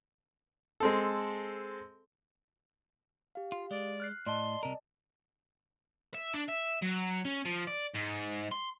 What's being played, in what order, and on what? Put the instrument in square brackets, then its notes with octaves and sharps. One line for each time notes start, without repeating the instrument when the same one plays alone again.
[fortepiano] G#3 C4 A4
[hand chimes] G4 F5
[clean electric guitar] F4
[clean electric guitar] G#3 [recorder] D5
[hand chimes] F6 F#6 C7
[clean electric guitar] A2 [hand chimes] D5 D#5 A5 [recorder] C6
[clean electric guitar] C2 C3 A#4
[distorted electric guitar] E5
D4
E5
F#3
C#4
F3
D5
G#2
C6